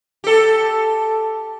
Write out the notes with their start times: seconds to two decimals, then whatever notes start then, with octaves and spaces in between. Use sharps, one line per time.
0.24 G4 A4